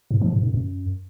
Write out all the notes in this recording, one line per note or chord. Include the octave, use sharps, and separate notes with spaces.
G#2
F3
G#2
F#2
F#2